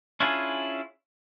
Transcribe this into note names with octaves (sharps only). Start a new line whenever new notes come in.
C#4 D4 E4 F4 G#4